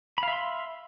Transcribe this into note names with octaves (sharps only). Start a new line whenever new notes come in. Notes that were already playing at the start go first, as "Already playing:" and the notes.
E5 F5 B5 C6